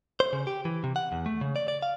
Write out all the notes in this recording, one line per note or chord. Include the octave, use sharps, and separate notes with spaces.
C5
C#3
G4
E3
C3
F#5
E2
A3
C#3
D5
D5
F5